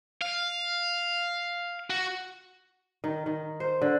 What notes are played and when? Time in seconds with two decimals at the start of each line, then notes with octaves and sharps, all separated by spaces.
0.22 F5
1.90 F#4
3.04 D#3
3.26 D#3
3.60 C5
3.82 D3